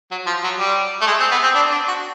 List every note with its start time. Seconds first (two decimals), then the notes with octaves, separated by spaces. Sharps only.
0.11 F#3
0.26 F3
0.43 F#3
0.58 G3
1.01 A3
1.07 G#3
1.20 C4
1.31 B3
1.43 C4
1.55 D4
1.71 D4
1.88 F#4